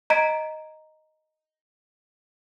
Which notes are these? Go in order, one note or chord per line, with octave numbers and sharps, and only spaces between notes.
D#5 A#5 G#6 B6 D7